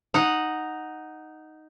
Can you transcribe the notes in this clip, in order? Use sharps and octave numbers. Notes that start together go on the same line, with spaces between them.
D#4 F#5